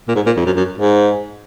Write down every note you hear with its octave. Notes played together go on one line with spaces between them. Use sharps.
A#2
G#2
A#2
F2
F#2
F#2
G#2